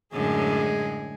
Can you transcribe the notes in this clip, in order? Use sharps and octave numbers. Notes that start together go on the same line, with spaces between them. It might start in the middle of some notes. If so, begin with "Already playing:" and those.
F#2 A2 D3 G#3 G#4